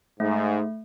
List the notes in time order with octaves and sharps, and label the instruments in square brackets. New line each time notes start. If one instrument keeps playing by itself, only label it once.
[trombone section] G#2 [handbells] A3